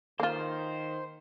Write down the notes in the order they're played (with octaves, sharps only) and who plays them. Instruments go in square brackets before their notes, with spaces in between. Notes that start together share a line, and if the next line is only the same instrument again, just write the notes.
[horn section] D#3 [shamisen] A#3 F4 [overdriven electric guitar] C5